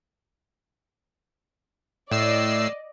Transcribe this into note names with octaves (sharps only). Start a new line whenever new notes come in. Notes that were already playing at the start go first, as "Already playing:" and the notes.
A2 D5 D#5 E6 C7